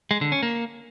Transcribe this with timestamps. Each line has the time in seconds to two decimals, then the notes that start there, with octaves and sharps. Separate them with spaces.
0.11 G#3
0.21 D3
0.32 C#4
0.43 A#3